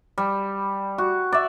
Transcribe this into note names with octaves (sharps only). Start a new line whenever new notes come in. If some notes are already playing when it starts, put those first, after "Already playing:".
G3
F#4
D5 E5